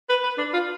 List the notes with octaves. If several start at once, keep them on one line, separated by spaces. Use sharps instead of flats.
B4
B4
D4
F4